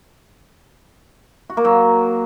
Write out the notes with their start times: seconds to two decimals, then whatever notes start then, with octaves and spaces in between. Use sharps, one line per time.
1.50 F#4
1.57 A#3
1.65 F#3